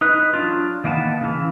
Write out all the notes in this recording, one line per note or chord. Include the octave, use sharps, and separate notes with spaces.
D#4 B4
F#3 D4 F4
D#3 A#3 B3 G#5 A5
C#3 E3